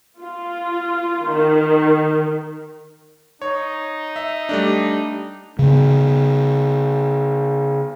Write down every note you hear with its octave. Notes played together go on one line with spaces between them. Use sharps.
F4
D#3
D#4 C#5
E5
G3 A3 D4
C#3 B3